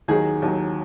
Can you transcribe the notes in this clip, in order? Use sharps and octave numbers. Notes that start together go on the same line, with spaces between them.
D#2 D#3 F#3 G#4
D#2 D#3 F#3